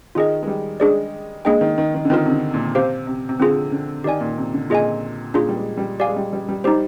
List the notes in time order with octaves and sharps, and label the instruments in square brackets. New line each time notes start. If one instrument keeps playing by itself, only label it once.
[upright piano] D#3 [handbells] F4 G#4 D#5
[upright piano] G#3
G3
[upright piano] G#3 [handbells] D4 G#4 D5
[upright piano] G#3 [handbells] A#3 D4 G#4 D#5 G5
[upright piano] D#3
D#3
D#3
D3
[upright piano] D#3 [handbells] C4 F4 A#4
[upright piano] C3
D3
A#2
[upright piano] C3 [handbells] G4 C5 F5
[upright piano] C3
C3
[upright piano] D3 [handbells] C4 F4 G#4
[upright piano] D3
[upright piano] D#3 [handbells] G4 D5 G#5
[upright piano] A#2
C3
D3
[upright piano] A#2 [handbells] F4 G#4 D#5 G#5
[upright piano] A#2 [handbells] D4 F4 G#4
[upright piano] G3
G#3
G3
[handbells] G4 D5 F5 G#5
[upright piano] G#3
G3
G3
G3
[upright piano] G3 [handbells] D#4 G4 C5